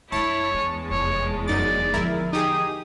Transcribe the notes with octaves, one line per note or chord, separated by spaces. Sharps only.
F#2 D4 E4 C#5 A5
E2 G#3 D4
F1 C#5
F#2 D#4 D5 A6
D3 F3 E4 A#4
D#4 G4 G#4 D#6